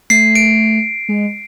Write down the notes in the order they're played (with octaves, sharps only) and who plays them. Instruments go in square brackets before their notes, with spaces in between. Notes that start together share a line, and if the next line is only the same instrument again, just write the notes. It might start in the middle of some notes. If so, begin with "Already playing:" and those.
[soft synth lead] A3 [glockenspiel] C7
[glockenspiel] D7
[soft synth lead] G#3